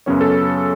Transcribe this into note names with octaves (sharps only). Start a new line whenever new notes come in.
F#2 C#3 F#3 B3 C#4 C#5
A4